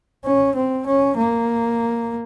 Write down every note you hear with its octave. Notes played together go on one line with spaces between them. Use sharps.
C#4
C4
C#4
A#3